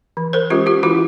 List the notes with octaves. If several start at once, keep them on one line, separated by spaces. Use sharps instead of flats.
E3
A#4 C5
G#3 C#4 F4 G4
F4 G4
E3 E4 F#4